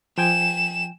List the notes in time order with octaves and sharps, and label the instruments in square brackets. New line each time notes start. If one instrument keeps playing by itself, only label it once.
[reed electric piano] F3 G5 G#5 [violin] E7